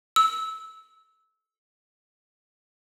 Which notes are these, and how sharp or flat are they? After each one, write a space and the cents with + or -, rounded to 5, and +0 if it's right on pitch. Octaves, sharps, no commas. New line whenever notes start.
E6 -20